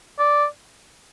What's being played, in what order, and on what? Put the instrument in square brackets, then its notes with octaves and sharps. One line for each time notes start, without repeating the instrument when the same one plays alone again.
[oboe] D5